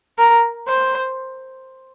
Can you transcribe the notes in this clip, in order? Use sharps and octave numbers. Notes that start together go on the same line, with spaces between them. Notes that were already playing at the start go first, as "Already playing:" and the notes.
A#4
C5